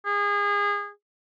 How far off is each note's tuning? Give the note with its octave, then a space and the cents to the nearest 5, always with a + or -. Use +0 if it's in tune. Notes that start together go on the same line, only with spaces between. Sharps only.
G#4 -30